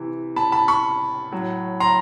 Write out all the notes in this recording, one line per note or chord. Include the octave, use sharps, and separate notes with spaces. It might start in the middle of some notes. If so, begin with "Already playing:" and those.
Already playing: C3 E3
A5 B5
A5 B5
B5 C#6
A2 F#3
A#5 C6